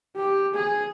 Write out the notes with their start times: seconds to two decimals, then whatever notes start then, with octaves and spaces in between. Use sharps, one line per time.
0.16 G4
0.54 G#4